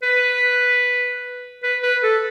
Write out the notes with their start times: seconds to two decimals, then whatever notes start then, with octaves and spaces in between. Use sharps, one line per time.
0.02 B4
1.63 B4
1.83 B4
2.03 A4